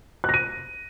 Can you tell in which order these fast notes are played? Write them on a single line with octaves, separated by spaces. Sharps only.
F#6 A#6 D#7